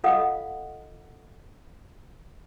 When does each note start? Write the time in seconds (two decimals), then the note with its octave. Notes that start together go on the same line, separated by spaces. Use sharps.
0.04 F4 A4 D#5 F5 F#5 D#6